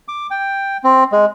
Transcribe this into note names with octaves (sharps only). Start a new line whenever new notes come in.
D6
G5
C4
G#3